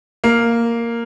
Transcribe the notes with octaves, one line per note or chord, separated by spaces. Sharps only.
A#3